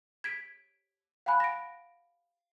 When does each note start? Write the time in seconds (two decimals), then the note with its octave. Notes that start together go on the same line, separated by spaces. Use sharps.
0.24 G#6 B6 D7
1.26 F5 F#5 G#5 B5 F#6
1.40 A#6 D7